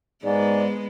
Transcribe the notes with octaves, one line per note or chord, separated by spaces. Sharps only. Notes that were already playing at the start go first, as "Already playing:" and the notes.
G#2 G#3 B3 D5